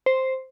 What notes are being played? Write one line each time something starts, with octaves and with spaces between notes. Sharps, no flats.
C5